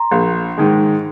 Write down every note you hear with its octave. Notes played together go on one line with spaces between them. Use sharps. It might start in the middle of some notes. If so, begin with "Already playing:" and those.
Already playing: A#5 C6
A#1
G#2 D#3 G#3